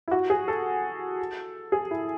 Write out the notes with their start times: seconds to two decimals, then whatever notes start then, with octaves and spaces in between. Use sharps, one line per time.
0.08 E4
0.11 F#4
0.30 G#4
0.48 A4
1.72 G#4
1.91 E4